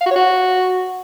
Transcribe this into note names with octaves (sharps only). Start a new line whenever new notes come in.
F5
F#4
C#5
F#4